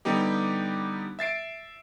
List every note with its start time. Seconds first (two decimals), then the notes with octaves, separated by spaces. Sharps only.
0.05 D3 G3 B3 D#4 G4
1.19 E5 A6 C7 D7